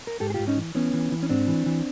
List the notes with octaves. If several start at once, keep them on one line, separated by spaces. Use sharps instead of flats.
A#4
G#2 G4 A4
G#4
G#2 F4 G4
C#4 D#4
E3
E3 B3 C#4
E3
E3
C#4
G#2 C4 D4
E3
E3